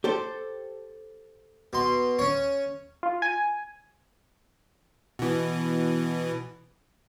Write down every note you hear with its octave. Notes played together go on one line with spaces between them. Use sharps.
G4 A4 C5
B2 C6
C#4 C#5
F4
G#5
B2 E3